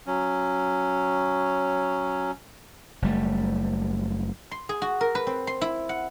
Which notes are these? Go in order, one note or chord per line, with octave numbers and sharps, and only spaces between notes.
F#3 C#4
F#1 G3 A3
C6
G#4
F#4
A#4
B4
C4
C6
E4
F#5